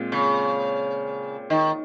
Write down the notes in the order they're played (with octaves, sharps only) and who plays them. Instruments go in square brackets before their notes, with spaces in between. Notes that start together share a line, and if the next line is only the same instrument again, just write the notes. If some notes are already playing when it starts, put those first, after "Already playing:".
Already playing: [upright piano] A#2 G#3 C4 F4
[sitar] C#3
D#3